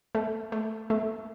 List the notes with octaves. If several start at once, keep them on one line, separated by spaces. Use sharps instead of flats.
A3
A3
A3